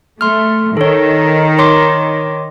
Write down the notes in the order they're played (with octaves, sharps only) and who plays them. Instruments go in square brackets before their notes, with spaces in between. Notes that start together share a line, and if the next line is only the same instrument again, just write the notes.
[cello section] A3 [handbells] C6 F6
[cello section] D#3 [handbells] A4 C#5
[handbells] C#5 C6 D6